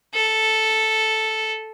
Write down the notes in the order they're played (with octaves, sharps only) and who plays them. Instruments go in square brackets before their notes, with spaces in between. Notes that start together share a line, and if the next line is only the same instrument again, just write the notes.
[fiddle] A4